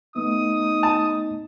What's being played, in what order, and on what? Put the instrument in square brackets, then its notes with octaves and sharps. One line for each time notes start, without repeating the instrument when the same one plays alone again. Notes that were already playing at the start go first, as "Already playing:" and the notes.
[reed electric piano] A3 B3 [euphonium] D#4 [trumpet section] D#6
[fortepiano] A5